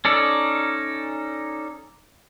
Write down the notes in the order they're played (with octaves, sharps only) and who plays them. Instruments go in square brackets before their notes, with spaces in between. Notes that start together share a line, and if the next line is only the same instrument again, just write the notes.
[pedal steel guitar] C#4 D#4 A4 D5